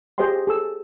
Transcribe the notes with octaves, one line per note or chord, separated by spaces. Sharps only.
G4 G#4 C5 D#5 G5 C6
G#4 A4 E6